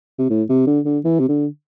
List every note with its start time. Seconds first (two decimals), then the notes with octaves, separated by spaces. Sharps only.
0.19 C3
0.30 A2
0.49 C3
0.67 D3
0.85 D3
1.05 E3
1.20 C3
1.29 D3